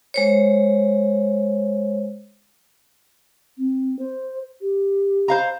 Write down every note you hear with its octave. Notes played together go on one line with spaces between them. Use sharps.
G#3 C5 C#5
C4
C5
G4
C5 F5 A#5